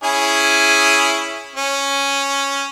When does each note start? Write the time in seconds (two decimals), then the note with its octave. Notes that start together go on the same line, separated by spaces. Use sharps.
0.03 C#4 E4 G#4
1.56 C#4